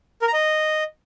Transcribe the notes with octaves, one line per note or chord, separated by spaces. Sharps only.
A#4
A#5
D#5